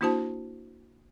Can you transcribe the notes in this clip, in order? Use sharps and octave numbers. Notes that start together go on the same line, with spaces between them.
A#3 D4 E4 F#4 C5 A5